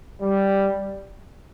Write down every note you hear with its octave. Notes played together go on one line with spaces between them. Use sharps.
G3